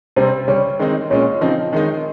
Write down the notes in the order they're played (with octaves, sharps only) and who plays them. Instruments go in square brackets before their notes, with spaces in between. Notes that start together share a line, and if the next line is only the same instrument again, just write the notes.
[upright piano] C3 G3 C4 [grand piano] C5
[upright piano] C#3 G3 C#4 [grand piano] C#5
[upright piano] D#3 G#3 C4 D#4
[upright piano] A#2 G#3 C#4 [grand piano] C#5
[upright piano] C#3 F3 C4 D#4
D#3 G#3 D#4